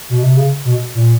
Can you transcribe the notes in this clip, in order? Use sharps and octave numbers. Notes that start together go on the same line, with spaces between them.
B2
C3
C#3
B2
A#2